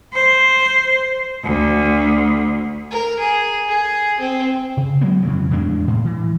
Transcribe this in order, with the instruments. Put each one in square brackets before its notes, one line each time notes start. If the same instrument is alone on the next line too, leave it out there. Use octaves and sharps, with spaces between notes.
[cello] C5
D2
[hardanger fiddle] A#4
G#4
G#4
C4
[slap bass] C#3
F#3 G#3 A#3 B3
F2 C#3 E3
E2 A2 G#3 D4
A2
E3